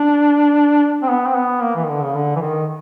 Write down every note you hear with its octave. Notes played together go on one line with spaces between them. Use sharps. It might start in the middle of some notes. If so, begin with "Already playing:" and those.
Already playing: D4
C4
B3
C4
B3
A#3
E3
D#3
D3
C#3
D3
E3
D#3